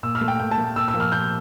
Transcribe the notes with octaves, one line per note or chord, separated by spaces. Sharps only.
A#2 E6
F6
A3
G5
A#2 G5
A5
A3
A#2 E6
E6
F3 A#3
F6
A#2 G6